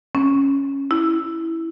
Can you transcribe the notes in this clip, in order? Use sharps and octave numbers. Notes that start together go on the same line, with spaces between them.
C#4
E4